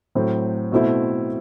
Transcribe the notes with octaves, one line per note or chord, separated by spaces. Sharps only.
A2 F#3 C4
B2 A3 C4 E4